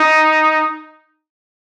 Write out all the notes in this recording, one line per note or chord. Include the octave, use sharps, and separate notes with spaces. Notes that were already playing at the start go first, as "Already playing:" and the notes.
Already playing: D#4